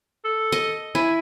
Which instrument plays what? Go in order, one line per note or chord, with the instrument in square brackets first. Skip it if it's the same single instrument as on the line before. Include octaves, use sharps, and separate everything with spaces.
[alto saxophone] A4
[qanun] D#5
[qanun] E4 [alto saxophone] G#5